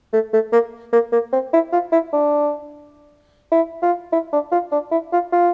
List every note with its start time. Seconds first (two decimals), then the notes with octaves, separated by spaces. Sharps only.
0.13 A3
0.33 A3
0.53 A#3
0.93 A#3
1.12 A#3
1.33 C4
1.53 E4
1.72 F4
1.92 E4
2.12 D4
3.52 E4
3.82 F4
4.12 E4
4.32 D4
4.52 F4
4.72 D4
4.91 E4
5.12 F4
5.32 F4